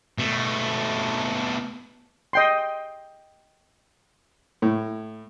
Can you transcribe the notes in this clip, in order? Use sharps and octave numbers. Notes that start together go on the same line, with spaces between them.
B2 A3
D#5 G5 C6
A2